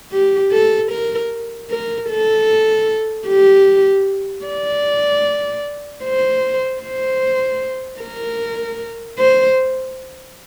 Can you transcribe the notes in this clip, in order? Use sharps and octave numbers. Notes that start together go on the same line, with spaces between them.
G4
A4
A#4
A#4
A4
G4
D5
C5
C5
A#4
C5